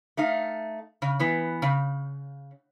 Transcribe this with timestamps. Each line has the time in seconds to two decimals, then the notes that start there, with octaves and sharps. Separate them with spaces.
0.17 A3 D#4 F5
1.02 C#3
1.20 E3 B3
1.62 C#3